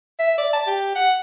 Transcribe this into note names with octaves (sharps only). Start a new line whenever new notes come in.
E5
D5
A5
G4
F#5